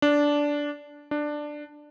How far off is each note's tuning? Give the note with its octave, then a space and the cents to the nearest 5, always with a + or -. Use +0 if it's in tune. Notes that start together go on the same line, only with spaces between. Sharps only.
D4 -10
D4 +10